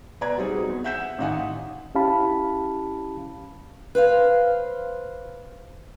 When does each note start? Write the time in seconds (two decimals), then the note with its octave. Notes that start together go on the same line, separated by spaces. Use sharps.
0.21 B2 B4 D5 A#5 G#6
0.37 F#3 G3 C4 D#4 G#4
0.69 E2
0.84 E5 F#5 G6 B6 E7
1.18 A1 D#3 D#4 F5 F#5 G#5
1.95 C#4 E4 G4 F5 A5 B5
3.95 B4 C5 E5 F5